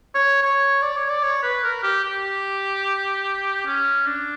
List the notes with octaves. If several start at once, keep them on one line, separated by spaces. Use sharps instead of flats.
C#5
C#5
D5
C#5
D5
C#5
B4
A#4
G4
G4
C#4
D4